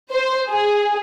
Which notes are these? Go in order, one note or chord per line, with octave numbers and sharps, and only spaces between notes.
C5
G#4